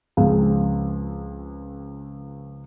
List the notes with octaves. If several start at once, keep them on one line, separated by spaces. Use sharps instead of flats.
C#2 F3 G#3 C4